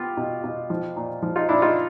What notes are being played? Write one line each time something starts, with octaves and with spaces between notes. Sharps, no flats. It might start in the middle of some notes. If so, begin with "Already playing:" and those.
Already playing: B3 F4 G4
B2
B2
F3
A#2
F3
D#4 F4
A#2 D4 E4
D#4 F4